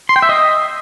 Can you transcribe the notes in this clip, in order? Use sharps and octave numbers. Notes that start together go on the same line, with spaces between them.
C6
G5
E5
D#5